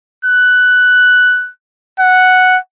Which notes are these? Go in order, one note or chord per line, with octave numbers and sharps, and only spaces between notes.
F#6
F#5